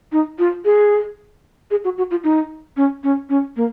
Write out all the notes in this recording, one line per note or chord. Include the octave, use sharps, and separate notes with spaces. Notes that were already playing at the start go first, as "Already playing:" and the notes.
D#4
F4
G#4
G#4
F#4
F#4
F4
D#4
C#4
C#4
C#4
A#3